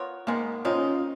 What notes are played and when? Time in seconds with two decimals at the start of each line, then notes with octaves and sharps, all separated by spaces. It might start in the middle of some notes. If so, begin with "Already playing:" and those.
Already playing: B3 F4 A#4 C#5
0.27 D#3 G#3 A#3 B3
0.65 D#3 G#3 C#4 D#4 F4